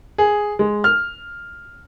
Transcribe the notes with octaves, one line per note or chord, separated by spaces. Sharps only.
G#4
G#3
F6